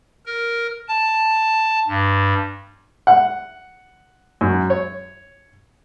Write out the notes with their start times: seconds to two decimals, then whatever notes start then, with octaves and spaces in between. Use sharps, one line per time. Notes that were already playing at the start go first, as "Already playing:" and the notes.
0.26 A#4
0.88 A5
1.88 G2
3.07 F#5
4.41 F#2
4.70 C#5